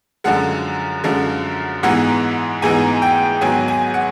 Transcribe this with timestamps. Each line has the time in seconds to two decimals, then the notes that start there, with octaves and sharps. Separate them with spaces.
0.24 F#2 D3 F3 G#3 F#5
1.04 F#2 D3 F3 G#3
1.83 G#2 E3 G#3 B3 D#4 F#5
2.62 G#2 E3 G#3 B3 D#4 G#5
3.02 G5
3.41 G#2 D#3 F#3 B3 G#5
3.68 G#5
3.94 F#5